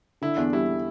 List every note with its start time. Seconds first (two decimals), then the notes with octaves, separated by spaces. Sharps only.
0.22 D3 E4
0.37 E2 D4
0.53 G3 E4